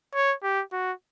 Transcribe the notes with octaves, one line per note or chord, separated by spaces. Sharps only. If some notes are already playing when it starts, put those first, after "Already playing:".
C#5
G4
F#4